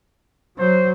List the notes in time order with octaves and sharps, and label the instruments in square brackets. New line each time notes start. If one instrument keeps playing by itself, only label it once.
[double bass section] F#3 [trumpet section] C5